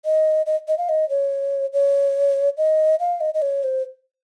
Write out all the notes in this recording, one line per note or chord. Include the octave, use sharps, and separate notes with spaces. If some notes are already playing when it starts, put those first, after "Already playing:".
D#5
D#5
D#5
F5
D#5
C#5
C#5
D#5
F5
D#5
D#5
C#5
C5